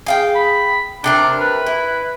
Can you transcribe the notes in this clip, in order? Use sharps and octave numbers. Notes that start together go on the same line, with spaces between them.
G#4 F5 G5
B5
C3 D4 G#4 A#4
B4
E4